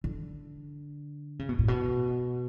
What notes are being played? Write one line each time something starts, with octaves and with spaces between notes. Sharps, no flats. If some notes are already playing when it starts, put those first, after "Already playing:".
D3
C#3
B2
A2
B2